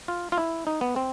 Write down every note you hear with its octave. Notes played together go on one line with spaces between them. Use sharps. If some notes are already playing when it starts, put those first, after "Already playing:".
F4
F4
E4
D#4
B3
C4